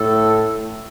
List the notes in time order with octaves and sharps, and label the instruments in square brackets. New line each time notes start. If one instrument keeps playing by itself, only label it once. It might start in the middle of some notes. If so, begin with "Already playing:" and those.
Already playing: [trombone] A2 [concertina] A4